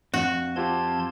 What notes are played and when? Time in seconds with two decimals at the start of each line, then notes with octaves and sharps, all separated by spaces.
0.14 F2 F#4
0.56 C4 F4 G4 A5 C6 G#6